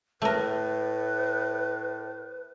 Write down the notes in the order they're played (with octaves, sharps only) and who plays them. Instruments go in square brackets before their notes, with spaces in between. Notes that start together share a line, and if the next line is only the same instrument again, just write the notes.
[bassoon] A2 [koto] A3 A#4 [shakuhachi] B4